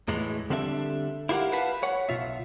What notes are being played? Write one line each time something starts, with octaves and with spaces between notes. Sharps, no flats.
E2 A2 E3 G#3
D3 G3 C4 D4 A4 E5
E4 F4 G4 A#4 F#5
B4 F5 F#5 A5 B5
C#5 F#5
B1 B2 F4 E5